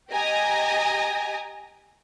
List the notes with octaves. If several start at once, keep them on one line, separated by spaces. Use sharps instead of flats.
G4 D#5 G#5 A#5 D#6